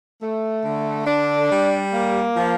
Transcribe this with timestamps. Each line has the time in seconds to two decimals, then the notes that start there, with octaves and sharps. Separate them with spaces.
0.22 A3
0.64 D3
1.07 D4
1.49 G3
1.92 A#3
2.35 F3